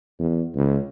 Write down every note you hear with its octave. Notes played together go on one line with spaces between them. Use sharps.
E2
C#2